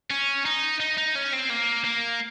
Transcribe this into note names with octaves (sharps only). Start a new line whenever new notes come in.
C#4
D#4
D#4
D#4
C#4
C4
A#3
A#3